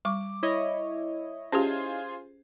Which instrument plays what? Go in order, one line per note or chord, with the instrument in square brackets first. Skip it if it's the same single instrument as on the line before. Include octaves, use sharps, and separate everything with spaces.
[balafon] G3 C#6 [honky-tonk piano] D6
[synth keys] E4 C#5 D#5
[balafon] C#4 G4 [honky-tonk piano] F4 G#4 C5